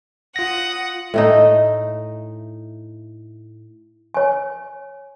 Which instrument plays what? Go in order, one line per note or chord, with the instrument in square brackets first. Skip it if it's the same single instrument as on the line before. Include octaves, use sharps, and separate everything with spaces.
[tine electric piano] F4 A#6 [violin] F#5 D#6
[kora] A2 A3 D#4
[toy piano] C#5 G#5